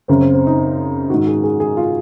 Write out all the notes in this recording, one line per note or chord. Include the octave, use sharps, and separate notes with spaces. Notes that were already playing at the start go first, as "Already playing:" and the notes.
F#2 C#3 C4
C4
C4
D#4
G#2 D#3 F#4
G#4
G#4
G#4
F4